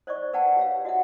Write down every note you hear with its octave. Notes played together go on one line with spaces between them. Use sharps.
C5 D5 D#5 C#6
B4 D5 F#5 G5 A5
G4 C#5 F5
F#4 D#5 E5 F#5